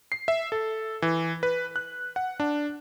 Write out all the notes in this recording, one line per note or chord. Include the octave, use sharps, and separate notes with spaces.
C7
E5
A4
E3
B4
F#6
F#5
D4